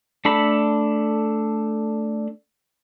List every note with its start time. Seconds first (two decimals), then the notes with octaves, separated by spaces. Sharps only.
0.25 A3 D4 A4 B5